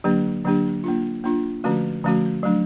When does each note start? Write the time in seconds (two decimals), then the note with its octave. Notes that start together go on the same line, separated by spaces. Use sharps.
0.04 D3 F#3 A#3 D4 G4
0.45 D3 F#3 A#3 D4 G4
0.84 A#3 D4 F4
1.24 A#3 D4 F4
1.64 D3 F3 A3 C#4 F#4
2.04 D3 F3 A3 C#4 F#4
2.43 F#3 A3 D4